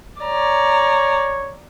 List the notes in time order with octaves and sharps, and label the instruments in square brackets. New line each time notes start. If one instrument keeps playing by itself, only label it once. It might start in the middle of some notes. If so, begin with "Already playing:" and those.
[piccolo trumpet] C#5 [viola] D5 A#5